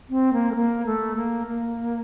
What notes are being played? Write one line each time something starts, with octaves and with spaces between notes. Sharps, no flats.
C4
A#3
A3
A#3
A3
A#3
A#3